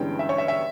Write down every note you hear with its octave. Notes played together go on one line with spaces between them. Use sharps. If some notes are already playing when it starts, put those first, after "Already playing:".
Already playing: G1 G2 E3 G#3 C#4 G5
E5
C#5
E5
E5